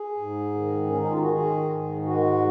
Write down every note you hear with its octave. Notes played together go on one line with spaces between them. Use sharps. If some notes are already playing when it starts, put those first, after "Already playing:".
Already playing: G#4
G#2
D#3
C#4
D#3 D#4
F4
F#4
D#3 G#4
G#2
G#3 F#4